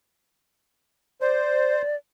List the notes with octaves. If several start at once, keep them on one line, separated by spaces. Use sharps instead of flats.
C5 D5